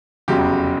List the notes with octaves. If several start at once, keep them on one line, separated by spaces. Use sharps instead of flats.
F1 E2 C#3 F#3 G4